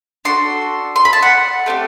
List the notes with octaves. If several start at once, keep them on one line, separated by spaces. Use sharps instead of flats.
D4 F#4 A4 C6
C6
B5
A5
F#5
A3 C4 E4 G4